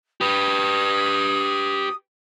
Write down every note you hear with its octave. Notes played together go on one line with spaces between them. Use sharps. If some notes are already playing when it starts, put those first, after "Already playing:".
G4 B4 D#6